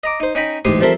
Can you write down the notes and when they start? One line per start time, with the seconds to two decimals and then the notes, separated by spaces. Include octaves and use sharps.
0.04 D#5 A#5 D6
0.20 D#4 C5
0.35 C#4 D#4 G5 A#5 B5
0.65 A1 D2 G#2 G4 C6 D#6
0.81 F3 G3 C4 A4 A#4 E5